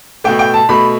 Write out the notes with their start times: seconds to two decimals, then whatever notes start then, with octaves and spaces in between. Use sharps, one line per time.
0.24 B2 A3 G5
0.39 G5
0.54 A5
0.69 B2 A3 B5